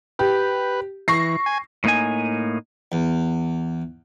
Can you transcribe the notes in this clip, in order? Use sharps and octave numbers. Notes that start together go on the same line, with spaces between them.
G4 B4
E3 C#6 A#6 C7
G#5
A2 A#3 D#4 G#5
E2